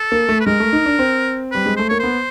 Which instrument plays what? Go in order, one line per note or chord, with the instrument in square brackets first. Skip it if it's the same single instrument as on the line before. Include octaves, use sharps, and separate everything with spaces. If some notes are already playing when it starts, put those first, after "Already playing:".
Already playing: [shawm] A4
[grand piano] A#3
A3
[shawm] B4
[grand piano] G#3 [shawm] A#4
[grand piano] A3
D#4
D4
C4
[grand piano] G3 [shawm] B4
[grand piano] G#3
[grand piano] A3 [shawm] C5
[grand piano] A#3 [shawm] C#5
[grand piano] B3 [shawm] C5